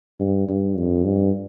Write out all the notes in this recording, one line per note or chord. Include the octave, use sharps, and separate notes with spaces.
G2
G2
F2
G2